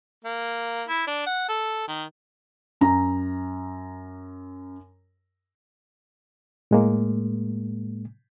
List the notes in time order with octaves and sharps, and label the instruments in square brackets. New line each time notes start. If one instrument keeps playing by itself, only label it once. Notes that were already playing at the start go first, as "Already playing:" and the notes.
[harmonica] A#3
E4
D4
F#5
A4
D#3
[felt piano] F#2 A#5
[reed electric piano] A2 G#3 A#3